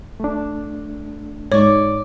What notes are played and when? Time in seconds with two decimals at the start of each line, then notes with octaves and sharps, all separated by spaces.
0.20 A3 D4
1.52 G#2 G#3 D#4 C#5 D5 C#6